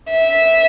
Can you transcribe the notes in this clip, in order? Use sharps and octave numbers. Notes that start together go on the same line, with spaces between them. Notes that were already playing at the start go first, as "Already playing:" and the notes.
E5